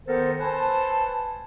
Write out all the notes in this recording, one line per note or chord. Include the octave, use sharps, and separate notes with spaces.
D#3 B3 A4 A#4 C5
B4 C5 G#5 A5